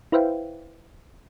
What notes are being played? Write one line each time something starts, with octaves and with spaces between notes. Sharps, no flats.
E4 B4 C5 E5 F5 G5